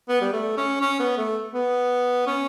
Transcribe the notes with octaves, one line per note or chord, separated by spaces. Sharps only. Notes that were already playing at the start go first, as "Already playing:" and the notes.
B3
G3
A3
C#4
C#4
B3
A3
B3
C#4